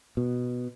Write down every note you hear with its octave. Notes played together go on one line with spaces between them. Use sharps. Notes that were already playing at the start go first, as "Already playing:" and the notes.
B2